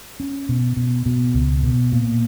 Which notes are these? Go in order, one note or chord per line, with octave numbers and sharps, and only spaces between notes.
C#4
B2
B2
B2
C#2
B2
A#2